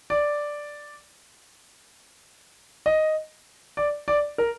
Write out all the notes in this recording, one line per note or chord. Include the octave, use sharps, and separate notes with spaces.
D5
D#5
D5
D5
A#4